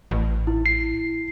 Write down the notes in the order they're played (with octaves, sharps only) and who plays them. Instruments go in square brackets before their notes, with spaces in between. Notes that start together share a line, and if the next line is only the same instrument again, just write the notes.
[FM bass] A1
[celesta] E4
[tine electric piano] C7